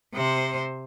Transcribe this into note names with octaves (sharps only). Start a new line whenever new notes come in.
C3 C5